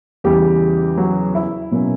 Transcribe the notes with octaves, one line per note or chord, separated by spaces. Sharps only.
E2 C#3 E3 G3 G4
F#3 F#4
E4
B2 F#3 A#3 C#4